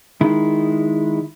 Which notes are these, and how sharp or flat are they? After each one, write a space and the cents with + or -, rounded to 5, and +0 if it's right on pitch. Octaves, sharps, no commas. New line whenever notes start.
D#3 +0 G#3 +0 E4 +0